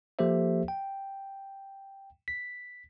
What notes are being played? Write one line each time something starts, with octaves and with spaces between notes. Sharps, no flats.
F3 A#3 G4 A4 C5 E5
G5
B6